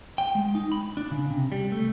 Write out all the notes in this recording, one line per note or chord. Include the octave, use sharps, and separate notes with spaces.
G5
G#3
D#4
B5
D4
C#3
C3
G3
A3